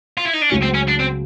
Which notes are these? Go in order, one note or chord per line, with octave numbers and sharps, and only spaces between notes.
F4
E4
D#4
D4
C#2 C#3 F#3 A3 C#4
C4
C#4
D4
C4